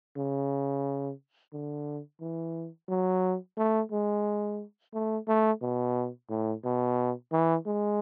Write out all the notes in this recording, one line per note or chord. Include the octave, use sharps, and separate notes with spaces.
C#3
D3
E3
F#3
A3
G#3
A3
A3
B2
A2
B2
E3
G#3